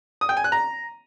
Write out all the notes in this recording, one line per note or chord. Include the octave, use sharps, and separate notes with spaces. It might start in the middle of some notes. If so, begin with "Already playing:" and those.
D#6
G5
G#5
F#6
A#5